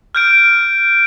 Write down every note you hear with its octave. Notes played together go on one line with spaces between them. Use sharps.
F6 G6 D7